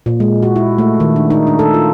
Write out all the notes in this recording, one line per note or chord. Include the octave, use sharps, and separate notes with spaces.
A#2
G#3
F#4
E4
A3
D#3
D4
D#4
D4
A4
F4